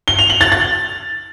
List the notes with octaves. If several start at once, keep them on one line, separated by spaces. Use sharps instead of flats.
G7
F7
F#7
A6
A6